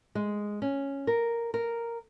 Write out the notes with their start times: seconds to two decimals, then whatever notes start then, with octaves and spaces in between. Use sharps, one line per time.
0.15 G#3
0.62 C#4
1.07 A#4
1.54 A#4